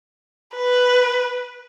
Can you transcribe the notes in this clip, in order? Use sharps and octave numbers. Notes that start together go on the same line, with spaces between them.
B4